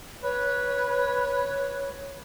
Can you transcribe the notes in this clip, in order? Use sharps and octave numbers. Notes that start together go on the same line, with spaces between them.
B4 C#5